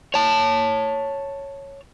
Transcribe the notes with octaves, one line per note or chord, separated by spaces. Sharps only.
C#5 A5